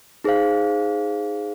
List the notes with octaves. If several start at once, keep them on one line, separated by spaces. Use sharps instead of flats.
D#4 G#4 C5 F5